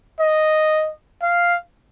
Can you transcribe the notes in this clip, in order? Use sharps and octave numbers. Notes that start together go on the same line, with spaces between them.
D#5
F5